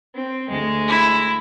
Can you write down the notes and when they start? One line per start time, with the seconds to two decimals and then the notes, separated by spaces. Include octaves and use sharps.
0.14 C4
0.49 D2 G#3
0.88 E4